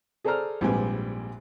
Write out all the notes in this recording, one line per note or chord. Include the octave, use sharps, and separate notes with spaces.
G#4 A4 C5 D5 A#5 F6
A#1 G#2 G3 C4 B4 G#5